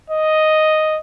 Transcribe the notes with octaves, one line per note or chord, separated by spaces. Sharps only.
D#5